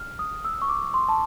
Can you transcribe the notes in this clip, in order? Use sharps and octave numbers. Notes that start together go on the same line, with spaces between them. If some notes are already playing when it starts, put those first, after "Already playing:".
Already playing: F6
D#6
E6
C#6
D6
C6
A5